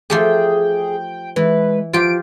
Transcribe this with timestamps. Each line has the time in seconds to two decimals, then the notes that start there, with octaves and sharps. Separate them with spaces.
0.10 F3 A3 G4 G#4 G5
1.36 E3 G#3 B4
1.93 F3 F4 G4 D7